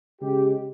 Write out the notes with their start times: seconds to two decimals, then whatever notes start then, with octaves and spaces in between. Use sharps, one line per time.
0.21 C#3 G#3 G4